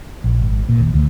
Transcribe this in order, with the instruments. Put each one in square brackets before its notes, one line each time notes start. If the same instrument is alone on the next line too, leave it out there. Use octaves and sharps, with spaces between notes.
[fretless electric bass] A#1
G#1
A#2
D#2
D2